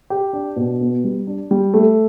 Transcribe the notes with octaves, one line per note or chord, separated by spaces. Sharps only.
G4
D4
B2
B3
G3
D4
G3
A3